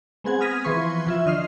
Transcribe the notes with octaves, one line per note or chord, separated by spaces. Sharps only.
G#3 B3 C4 G#4 F#5 G#6
D#6 F6 G#6 A#6 B6 D#7
E3 F3 B4 C6 C#6 G#6
F3 F4 E5
D3 D#5 F6 C7